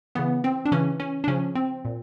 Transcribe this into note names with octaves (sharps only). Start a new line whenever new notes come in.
C#3 E3 B3
C4
D4
C#3 E3 C#4
C#4
D4
C#3 F3 C#4
C4
A#2